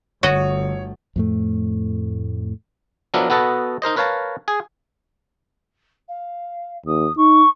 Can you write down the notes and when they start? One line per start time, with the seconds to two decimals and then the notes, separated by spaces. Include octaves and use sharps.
0.23 G1 D3 A3 F#4 C#5 D#5
1.16 F2 A2 A3
3.14 F3 F#3 B3 D4 A#4 E5
3.30 B3 F#4 A4 B4 D#5 A5
3.82 D#4 A#4 C5 D#5
3.96 A#4 B4 C#5 F5 A5 A#5
4.48 G#4 G#5
6.08 F5
6.86 D#2 D#6
7.17 D#4 C#6